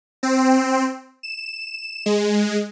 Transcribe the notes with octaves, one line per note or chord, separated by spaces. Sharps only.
C4
E7
G#3